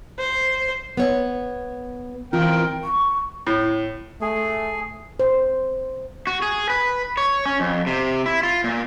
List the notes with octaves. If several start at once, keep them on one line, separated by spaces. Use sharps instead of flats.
C5
B3 C#5
E3 C4 F4 A#4 G5
C#6
A2
A3 G#4
C5
F#4
G#4
B4
C#5
C#4
F2
C3
E4
F4
A#2